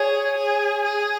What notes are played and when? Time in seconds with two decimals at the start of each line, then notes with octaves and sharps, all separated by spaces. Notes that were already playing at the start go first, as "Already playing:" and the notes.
Already playing: G#4 C#5
0.37 G#4
0.83 G#4